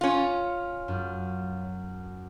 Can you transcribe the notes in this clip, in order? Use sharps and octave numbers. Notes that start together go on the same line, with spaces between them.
C#4 F4
F#2